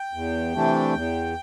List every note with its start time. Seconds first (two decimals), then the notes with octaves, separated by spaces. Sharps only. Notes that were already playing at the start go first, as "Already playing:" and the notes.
Already playing: G5
0.13 E2
0.54 C3 E3 A3 D4
0.94 E2